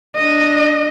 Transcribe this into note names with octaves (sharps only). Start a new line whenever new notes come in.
D4 D#5